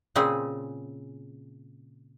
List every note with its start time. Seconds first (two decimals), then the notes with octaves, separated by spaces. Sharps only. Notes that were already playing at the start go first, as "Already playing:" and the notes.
0.16 A#2 C#3 C4 C#4 G#4 G#5